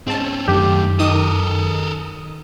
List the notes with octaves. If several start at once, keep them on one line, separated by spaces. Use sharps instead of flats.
G#2 C4 C#4 A5
F#2 D#3 A3 G4
D#3 A4 A#4 D#6